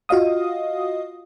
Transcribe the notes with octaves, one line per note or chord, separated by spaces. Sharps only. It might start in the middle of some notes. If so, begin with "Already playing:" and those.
F4 F#4 D#5 F5 D#6